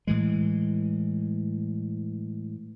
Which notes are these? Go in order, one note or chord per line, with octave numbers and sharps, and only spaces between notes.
A2 E3 G#3